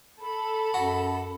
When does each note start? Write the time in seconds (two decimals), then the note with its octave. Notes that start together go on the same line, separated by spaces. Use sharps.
0.21 A4 B5
0.74 F#2 F#4